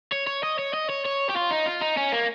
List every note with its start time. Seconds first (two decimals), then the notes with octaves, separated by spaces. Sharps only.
0.12 C#5
0.27 C#5
0.43 D#5
0.59 C#5
0.73 D#5
0.89 C#5
1.05 C#5
1.29 G4
1.36 F4
1.51 D#4
1.66 F4
1.81 D#4
1.97 C#4
2.12 A#3